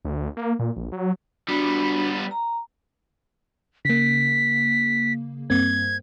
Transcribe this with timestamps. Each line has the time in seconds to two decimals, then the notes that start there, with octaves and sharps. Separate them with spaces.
0.05 D2
0.37 A#3
0.59 A#2
0.76 A#1
0.92 F#3
1.48 G3 B3 D4 F#4 B5
2.31 A#5
3.85 C#3 A#3 B6
5.50 G2 A#3 C4 G#6